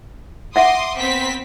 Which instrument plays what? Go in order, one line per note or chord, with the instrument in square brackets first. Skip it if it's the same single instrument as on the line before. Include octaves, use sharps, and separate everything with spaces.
[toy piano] E5 F#5 [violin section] C6 D6 D#6
[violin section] B3 C4 B6